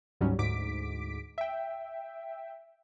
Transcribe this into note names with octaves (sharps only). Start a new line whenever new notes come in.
D2 G#2 F#3 G3 C#4
D2 G#2 D6 B6 D7
E5 G5